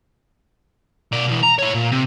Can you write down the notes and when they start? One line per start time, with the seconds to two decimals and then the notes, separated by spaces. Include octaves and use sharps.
1.12 B2 D5
1.28 B2 E3
1.43 A#5
1.59 E4 C#5
1.75 A#2
1.92 C3